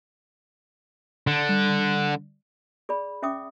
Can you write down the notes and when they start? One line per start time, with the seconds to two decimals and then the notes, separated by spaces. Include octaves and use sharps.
1.27 D3
1.49 G3
2.89 G#4 D5 B5
3.22 C#4 E5 G5 D6 D#6